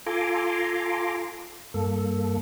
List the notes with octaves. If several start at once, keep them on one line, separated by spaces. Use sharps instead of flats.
F4 A4 G#5 A#5 C6 D6
G2 A#3 A4